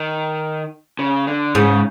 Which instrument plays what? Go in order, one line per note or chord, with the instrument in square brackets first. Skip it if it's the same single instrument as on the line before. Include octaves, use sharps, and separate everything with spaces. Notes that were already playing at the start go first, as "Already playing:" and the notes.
Already playing: [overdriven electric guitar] D#3
C#3
D3
[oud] G#2 [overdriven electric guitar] C#3